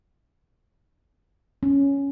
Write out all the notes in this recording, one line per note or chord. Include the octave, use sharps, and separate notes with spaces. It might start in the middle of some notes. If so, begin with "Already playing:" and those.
C#4